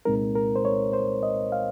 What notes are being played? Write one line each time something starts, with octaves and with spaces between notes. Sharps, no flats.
C2 A#2 G#3 C4 D#4 A#4
A#4
C5
C#5
C5
D#5
F5